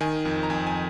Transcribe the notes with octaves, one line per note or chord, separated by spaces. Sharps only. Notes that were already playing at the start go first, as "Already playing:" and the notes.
D#3 G#5
F2
A#5
F2 G#5
G#5